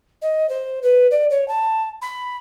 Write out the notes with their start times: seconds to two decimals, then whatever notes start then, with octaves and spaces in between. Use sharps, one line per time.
0.22 D#5
0.49 C5
0.83 B4
1.11 D5
1.30 C#5
1.48 A5
2.02 B5